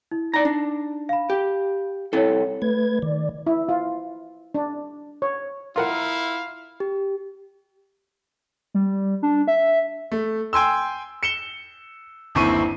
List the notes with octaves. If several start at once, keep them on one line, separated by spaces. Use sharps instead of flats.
E4
D#4 D5 A#5
D4
F5 B5
G4
C2 C4 E4 A4 C#5
A3 B4 G#6
D#3 D5
E4
F4
D4
C#5
E4 F4 A#4 F5 F#5
G4
G3
D4
E5
A3
G5 G#5 C6 E6
C#7 E7 G7
G1 D#2 C4 E4 C#6 D#7